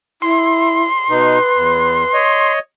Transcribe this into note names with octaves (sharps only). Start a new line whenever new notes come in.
E4 C6
B2 D#4 B4
E2
C#5 D#5